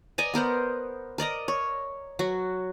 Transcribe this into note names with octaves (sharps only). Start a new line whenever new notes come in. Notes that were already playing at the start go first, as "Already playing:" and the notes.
D5 D#5 G#5 A#5
B3 A#4 C5 F#5
A#4 D5 D#5 A#5
C#5
F#3 F#4